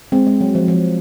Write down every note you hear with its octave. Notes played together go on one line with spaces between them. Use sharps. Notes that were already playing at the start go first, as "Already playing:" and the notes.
G#3 C4
G#3
F#3
F3
F3